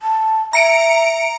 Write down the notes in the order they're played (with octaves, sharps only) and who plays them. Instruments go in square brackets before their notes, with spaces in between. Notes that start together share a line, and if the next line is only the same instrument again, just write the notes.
[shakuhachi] A5
[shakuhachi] E5 [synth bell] A#5 C#7 D7